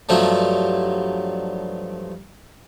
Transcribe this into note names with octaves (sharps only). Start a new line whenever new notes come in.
G2 F3 F#3 A3